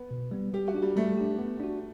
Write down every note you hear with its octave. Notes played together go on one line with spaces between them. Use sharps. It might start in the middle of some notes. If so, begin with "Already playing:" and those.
Already playing: B3
B2
G3 B3
G3 G4
F#4
D4 G4
G3
G3 A3
D4 G4
B3
D4 F#4